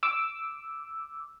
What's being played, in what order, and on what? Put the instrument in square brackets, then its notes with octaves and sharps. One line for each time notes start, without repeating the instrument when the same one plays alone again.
[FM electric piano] D6 E6